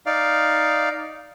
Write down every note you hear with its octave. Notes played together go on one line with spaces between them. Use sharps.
D#4 D5 F5